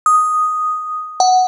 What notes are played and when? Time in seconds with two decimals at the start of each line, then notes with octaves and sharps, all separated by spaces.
0.06 D#6
1.20 F#5